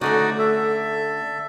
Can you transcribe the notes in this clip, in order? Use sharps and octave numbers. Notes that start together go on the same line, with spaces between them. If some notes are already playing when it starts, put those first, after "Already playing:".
D3 A3 C#4 D#4 F#4 D5
A4 E5